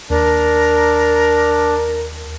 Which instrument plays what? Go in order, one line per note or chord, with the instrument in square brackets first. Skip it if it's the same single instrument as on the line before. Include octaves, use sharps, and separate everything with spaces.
[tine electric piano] D#2 [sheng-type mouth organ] D4 [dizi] A#4